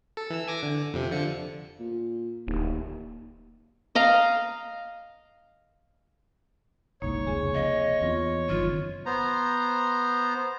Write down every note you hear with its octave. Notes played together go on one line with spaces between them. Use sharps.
A4
E3 E6
G#5 D6 A#6
D3
F2 C3
D3 F3 C#7
A#2
D1 D#2
D#5 F5 A#5
F#1 C2 G#2 A#3 D#4 C#5
F1 C#2 C#3 G#4 G#5
C3 F3 D#5
E2 C4 F4
F#1 F#2 C3 D#3 F4 F6
B3 C5 A#5